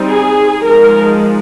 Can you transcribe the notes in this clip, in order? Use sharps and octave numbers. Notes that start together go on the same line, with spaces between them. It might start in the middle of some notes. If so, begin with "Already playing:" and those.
Already playing: G3 C4 D#4
G#4
F3 G#3 D#4 A#4